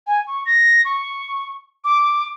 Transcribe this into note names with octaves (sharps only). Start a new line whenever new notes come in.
G#5
C#6
A#6
C#6
D6